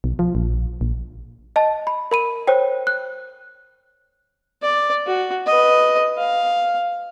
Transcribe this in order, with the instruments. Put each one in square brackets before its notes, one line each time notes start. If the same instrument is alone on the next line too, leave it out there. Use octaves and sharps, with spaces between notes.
[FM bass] B1
F3
A#1
A#1
[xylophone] D#5 A5
B5
A#4 B5 D#7
C5 C#5 G5
F#6
[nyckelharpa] D5
F#4
B4 D#5
F5